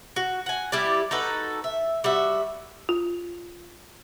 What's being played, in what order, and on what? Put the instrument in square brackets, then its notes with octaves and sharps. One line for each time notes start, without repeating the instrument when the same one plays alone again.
[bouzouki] F#4
F#5 G#5
G3 E4 G4 D5
D#4 F#4 A4 B4
E5
G3 F#4 E5
[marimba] F4